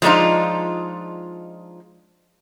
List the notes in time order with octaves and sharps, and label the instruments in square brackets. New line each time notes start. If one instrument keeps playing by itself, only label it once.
[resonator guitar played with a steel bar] F3 G#3 B3 D4 D#4 F4